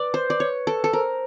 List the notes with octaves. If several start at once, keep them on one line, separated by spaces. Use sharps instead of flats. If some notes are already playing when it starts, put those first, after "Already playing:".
Already playing: B4 D5
C5
D5
C#5
A4
A4
A#4 C5